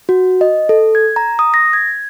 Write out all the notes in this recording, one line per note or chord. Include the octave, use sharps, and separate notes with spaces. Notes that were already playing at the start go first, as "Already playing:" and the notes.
F#4
D#5
A4
G#6
A#5
D#6
A#6
G#6